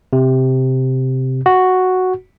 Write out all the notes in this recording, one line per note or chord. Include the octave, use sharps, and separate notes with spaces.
C3
F#4